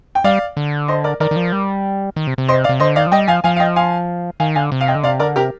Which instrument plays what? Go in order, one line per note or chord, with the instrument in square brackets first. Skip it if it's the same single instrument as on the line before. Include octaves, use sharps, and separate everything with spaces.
[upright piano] G5
[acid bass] G3 [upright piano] D5 F5
[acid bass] D3
[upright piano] C5 D#5
A#4 D5
[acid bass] D#3 [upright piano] A#4 D5
[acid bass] D#3
F3
G3
D#3
C3
C3
[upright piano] C5 D#5
D5 F5
[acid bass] C3
[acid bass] D3 [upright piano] C5 D#5
[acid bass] D#3 [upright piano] D5 F5
[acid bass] F3
[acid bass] G3 [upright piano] D#5 G5
[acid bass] F3 [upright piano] F5 G#5
[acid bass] F3 [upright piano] F5 G#5
[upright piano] F5
D#5 G5
F5 G#5
[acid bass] D#3 [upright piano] F5 G#5
[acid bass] D3 [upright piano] F5 G#5
[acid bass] C3
[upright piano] F5
D#5 G5
[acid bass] D3
[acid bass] C3 [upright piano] D5 F5
[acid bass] D3 [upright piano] A#4 D5
[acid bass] C3 [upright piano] G4 A#4